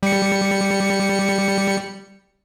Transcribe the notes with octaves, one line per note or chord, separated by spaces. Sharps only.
G3 C#7